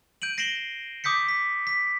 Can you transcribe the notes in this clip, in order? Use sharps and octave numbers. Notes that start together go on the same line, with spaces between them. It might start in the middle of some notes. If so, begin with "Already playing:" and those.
G6 D7 D#7 F#7
A#6 C7 D7 E7 F#7 G7
D6 D#6 G6 B6 C#7
B6
B6